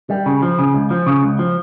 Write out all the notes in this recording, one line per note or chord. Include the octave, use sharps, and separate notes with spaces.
G3
C#3
F3
C#3
C#2
F3
C#3
C#2
F3